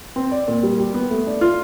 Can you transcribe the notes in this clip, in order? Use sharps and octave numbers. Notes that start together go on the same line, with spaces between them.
C4
D5
A#2
G3
G4
B3
A3
D4
F4